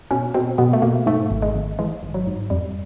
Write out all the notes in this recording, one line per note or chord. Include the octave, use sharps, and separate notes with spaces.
B2 C#4
B2 C4
B2 B3
A3
B2 A#3
G#2 A3
G#1
G#3
G#1
E3 G#3
G#1
F#3
G#2
F2 G3